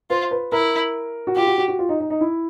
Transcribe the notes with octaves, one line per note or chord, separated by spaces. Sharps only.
F4 C5
B4
E4 A#4
F#4
F4 G4
F#4
F#4
F#4
F4
D#4
D#4
D#4
E4